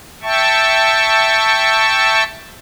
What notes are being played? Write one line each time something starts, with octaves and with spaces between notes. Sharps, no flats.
E5 G5 A5 C#6